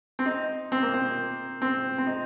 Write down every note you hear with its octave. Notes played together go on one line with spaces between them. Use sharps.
C4
D#4
C4
A#3
C4
C4
C4
D#4